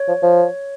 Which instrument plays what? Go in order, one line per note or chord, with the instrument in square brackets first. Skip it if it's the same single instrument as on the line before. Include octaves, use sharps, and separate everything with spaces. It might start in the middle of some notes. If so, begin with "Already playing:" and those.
Already playing: [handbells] C#5
[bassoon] F3
F3